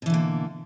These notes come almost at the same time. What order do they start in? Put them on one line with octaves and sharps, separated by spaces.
B2 E3 D3 A#3